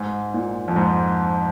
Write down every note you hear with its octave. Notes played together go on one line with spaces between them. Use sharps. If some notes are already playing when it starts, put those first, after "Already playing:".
Already playing: G#2
A#2
F2
G#2